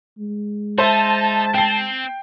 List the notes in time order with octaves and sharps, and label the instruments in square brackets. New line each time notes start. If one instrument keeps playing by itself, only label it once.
[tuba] G#3
[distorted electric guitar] D#4 [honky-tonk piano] C5 E5 C6 [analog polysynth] A5
[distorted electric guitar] C4 [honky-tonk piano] G5 C7